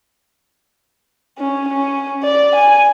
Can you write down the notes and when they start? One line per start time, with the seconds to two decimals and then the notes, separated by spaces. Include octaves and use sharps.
1.38 C#4
1.68 C#4
2.23 D5
2.55 G#5